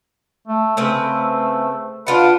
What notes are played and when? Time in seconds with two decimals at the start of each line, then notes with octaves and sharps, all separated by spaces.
0.47 A3
0.77 C#3 A3 C4 B4
2.07 D4 F4 B4 F#5